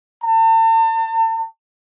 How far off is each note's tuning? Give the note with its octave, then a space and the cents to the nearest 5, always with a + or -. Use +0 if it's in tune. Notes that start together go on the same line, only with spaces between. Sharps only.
A5 +40